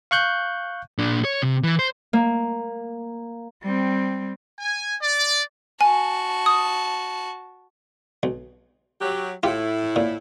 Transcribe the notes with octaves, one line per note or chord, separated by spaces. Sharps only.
F5 C#6 F#6 G6
A#2 D4
C#5
C3
E3
C5
A#3
G3 C4
G#5
D5
F#4 G#5 A5
D#6
B1
F#3 G4
A2 E4 F4 G4
A#2